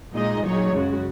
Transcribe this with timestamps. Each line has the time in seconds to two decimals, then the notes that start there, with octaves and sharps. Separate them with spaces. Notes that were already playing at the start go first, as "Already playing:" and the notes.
0.14 A#2 G#3 D#4 G#4 D#5
0.43 A#2 F#3 D#4 G#4 C#5
0.73 F#2 C#3 G#3 F#4